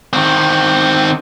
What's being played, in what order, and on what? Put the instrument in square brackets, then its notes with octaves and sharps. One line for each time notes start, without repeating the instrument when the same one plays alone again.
[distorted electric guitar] D#3 C4